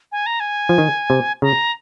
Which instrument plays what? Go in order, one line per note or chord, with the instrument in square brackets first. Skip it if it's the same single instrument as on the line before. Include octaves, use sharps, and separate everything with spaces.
[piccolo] G#5
A#5
G#5
[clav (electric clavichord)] F3
D#3
C3
[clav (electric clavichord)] C#3 [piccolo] A#5